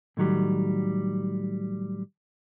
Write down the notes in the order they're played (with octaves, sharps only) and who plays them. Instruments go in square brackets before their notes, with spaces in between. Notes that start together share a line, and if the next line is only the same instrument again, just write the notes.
[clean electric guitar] A2 D#3 F#3 G3